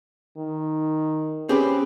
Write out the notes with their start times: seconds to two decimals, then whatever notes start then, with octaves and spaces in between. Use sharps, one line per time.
0.38 D#3
1.49 C4 C#4 G4 G#4 B4